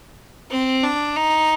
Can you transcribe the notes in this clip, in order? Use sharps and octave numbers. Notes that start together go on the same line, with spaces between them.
C4
D4
D#4